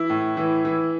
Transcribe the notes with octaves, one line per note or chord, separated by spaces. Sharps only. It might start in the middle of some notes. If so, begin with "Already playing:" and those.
Already playing: E3 E4
A2
E3
E3